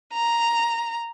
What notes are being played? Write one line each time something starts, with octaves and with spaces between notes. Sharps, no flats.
A#5